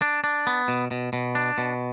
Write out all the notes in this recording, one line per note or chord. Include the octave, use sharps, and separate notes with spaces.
D4
D4
B3
B2
B2
B2
D4
B2